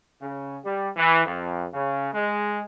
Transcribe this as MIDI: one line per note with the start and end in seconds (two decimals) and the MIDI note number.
0.20 0.57 49
0.65 0.89 55
0.96 1.23 52
1.24 1.65 41
1.74 2.08 49
2.13 2.61 56